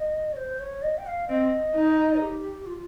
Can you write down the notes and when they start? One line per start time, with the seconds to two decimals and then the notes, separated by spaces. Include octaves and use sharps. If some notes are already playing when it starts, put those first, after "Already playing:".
Already playing: D#5
0.33 C#5
0.37 C5
0.60 C#5
0.82 D#5
0.98 G5
1.06 F5
1.29 C4 D#5
1.75 D#4
2.21 G4
2.66 F4